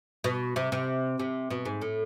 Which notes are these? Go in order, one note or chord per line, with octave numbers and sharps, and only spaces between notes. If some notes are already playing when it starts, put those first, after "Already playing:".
B2
C3
C3
C3
B2
G#2
A2